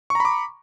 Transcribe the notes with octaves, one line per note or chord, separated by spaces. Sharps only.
A#5 B5 C#6 D6